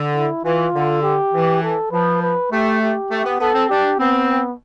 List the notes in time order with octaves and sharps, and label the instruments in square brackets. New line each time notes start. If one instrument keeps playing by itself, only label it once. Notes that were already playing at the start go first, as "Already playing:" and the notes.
Already playing: [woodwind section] D3
[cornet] E4
[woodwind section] E3 [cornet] F4
[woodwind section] D3
[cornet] G4
[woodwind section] E3
[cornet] A4
[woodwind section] F3 [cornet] B4
[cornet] B4
[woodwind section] A3 [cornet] G4
[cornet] G4
[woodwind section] A3
B3
[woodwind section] B3 [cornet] A4
[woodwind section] C4
[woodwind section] D4 [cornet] G4
[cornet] B3 [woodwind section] C4